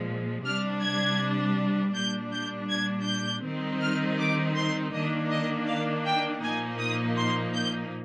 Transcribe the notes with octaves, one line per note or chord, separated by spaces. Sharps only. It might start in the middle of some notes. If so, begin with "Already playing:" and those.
Already playing: A#2 F3 G#3
C3 G3 D4 F6
G#6
A#2 G3 D4 G6
G6
G#6
G6
D#3 G3 C4 D#4
F6
D6
C6
D#3 A#3 D4 D#5
D#5
F5
G5
A#2 F3 A#3 D#4 G#5
D#6
C6
G6